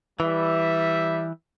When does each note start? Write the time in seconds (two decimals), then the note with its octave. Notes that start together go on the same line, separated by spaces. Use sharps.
0.20 E3 G3 E5